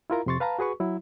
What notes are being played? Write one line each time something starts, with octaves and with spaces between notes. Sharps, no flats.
E4 F4 A#4 A#5
F2 C3 C6 C#6 A6
B4 F5 A5 A#5
F#4 G#4 B4 C#6
F#3 E4